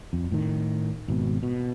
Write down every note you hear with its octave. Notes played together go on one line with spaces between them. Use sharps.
F2
A2 D#3
G#1 B2
B2